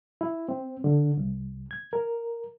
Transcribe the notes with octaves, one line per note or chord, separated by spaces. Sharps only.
E4
C4
D3
C2
G#6
A#4